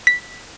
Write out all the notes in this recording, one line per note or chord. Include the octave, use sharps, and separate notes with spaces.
B6